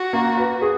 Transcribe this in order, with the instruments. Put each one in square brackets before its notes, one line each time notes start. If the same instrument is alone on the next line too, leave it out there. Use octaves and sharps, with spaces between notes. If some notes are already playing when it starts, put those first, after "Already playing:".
Already playing: [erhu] F#4
[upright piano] A#3
B4
G#4